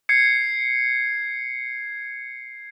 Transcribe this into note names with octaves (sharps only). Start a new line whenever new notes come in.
G#6 C7 C#7